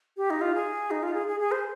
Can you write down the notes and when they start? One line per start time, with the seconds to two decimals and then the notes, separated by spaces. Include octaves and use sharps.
0.17 G4
0.30 D#4
0.41 F4
0.55 G#4
0.91 D#4
1.03 F4
1.14 G#4
1.27 G#4
1.40 G#4
1.51 C5